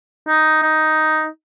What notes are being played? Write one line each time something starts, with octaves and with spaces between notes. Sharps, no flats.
D#4
D#4